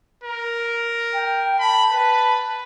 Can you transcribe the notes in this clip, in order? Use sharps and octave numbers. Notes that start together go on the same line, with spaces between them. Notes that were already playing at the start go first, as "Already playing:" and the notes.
A#4
G5
A5 B5
B4